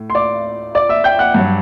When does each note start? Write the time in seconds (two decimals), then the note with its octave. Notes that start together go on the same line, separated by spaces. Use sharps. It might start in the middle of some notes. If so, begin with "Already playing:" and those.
Already playing: A2
0.10 C6
0.15 D5 D6
0.75 D5 D6
0.89 E5 E6
1.04 G5 G6
1.19 F#5 F#6
1.34 G2 F#3